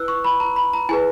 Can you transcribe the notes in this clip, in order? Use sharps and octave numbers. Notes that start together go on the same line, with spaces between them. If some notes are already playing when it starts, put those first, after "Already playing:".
Already playing: E4 B4 E6 F#6
C#6
B5
A#5
B5
A#5
E4 G#4 B4 G#5